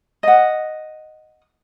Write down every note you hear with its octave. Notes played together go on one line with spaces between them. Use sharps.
D#5 F#5